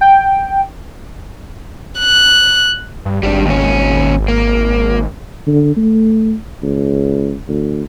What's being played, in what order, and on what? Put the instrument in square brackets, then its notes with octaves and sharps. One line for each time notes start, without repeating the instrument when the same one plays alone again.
[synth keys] G5
[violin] F#6
[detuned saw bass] G2
[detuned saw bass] G#1 [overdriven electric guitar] G3 D4
[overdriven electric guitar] D#2 C#4
A#3
[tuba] D3
A3
C#2
D2